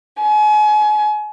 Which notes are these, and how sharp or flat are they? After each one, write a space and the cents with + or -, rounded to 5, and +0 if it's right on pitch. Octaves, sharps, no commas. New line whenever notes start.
G#5 +35